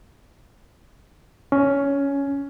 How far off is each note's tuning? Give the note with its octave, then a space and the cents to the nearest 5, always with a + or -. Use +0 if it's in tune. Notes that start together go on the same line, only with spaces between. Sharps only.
C#4 +10